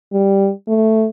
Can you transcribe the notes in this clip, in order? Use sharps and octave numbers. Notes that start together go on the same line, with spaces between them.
G3
A3